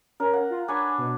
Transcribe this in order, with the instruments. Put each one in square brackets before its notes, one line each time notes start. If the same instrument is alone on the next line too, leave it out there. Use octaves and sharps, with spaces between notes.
[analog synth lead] C#4 [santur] A#4
[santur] F#5
[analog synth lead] F4
[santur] D4 B4 C#5 [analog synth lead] G#5
[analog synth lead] B2